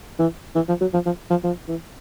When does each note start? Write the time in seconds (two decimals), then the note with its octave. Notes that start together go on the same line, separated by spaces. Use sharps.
0.19 E3
0.55 E3
0.68 F3
0.81 F#3
0.94 F3
1.06 F3
1.30 F3
1.44 F3
1.68 E3